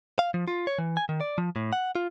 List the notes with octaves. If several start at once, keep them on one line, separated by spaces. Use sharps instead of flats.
F5
F3
F4
C#5
E3
G#5
D#3
D5
F3
A2
F#5
F4